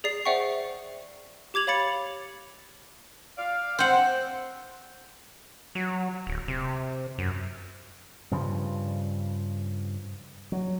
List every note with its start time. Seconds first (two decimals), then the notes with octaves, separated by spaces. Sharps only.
0.04 G#4 D5 C7
0.25 C5 D5 E5 F#5 G5 C#6
1.54 G4 D6 G#6 F7 F#7
1.67 C#5 F5 B5 A6 C#7 F7
3.38 D5 F5
3.79 C4 C5 F#5 G5
5.75 F#3
6.27 D1
6.48 C3
7.18 F#2
8.31 G2 C#3 F3
10.52 F#3